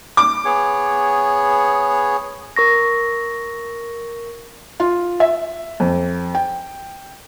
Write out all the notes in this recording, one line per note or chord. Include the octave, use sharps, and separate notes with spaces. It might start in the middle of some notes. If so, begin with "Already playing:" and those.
D6
B3 G#4 C#5
A#4 C#6 A#6
F4
E5
F2
G5